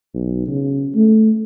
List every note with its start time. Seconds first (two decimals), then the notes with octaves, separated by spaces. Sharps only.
0.14 B1
0.47 C#3
0.95 A3